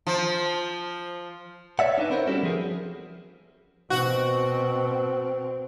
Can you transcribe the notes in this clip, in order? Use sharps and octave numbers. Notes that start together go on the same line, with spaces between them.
F3
C#5 D5 E5 F#5
D4 D#4 B4
C4 E4 A#4 C5 C#5
G3 B3 C#4 F#4 A4
F3 G#4 A#4
B2 C4 F#4